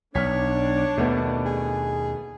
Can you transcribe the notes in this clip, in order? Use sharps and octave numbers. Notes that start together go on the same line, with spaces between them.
B1 D4 C#5 F6 B6
D#2 B2 A3 B3
G#4